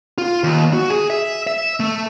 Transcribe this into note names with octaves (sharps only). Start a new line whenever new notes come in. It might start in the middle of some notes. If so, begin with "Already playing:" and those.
F4
D#2
F#4
G#4
E5
E5
A3